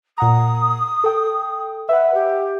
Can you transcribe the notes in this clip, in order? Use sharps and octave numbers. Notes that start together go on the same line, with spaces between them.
A#2 F#5 A#5 D#6
A4 G5
B4 E5 F#5
G4